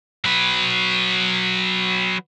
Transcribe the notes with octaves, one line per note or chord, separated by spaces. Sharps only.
F#3 B4